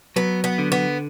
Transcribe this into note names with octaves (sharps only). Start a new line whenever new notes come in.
F#3 B3
B3
D3
B3